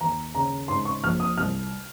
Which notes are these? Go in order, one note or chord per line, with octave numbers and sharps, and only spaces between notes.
D#2 A#5
C#3 A#5
G#2 C6
C#6
A#1 F6
D#6
C2 F6